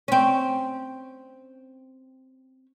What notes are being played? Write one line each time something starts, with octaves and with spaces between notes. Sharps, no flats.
C4 C#4